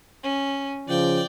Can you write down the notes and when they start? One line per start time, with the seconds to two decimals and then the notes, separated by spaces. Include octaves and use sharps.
0.23 C#4
0.88 C#3 F3 D5 G5